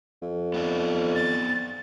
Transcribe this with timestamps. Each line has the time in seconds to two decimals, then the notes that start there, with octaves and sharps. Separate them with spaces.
0.22 F2
0.54 B3 D#4 D5
1.15 A6